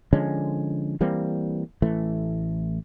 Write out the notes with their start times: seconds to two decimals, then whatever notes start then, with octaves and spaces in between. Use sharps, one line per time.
0.13 D3 F3 G#3 C#4
1.01 E3 G3 A#3 C4
1.82 A1 E3 A3